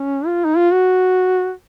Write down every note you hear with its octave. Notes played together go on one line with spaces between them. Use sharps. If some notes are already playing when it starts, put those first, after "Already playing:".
Already playing: C#4
F4
D#4
F4
F#4